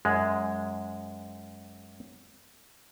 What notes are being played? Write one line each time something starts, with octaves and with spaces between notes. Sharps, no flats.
F#2 G#3